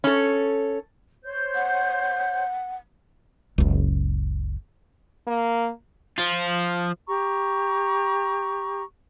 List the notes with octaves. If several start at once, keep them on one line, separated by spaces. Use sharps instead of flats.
C#4 A4
C5 C#5 G6
F#5
F#1 C#2
A#3
F3 F4
G4 A#5 C#6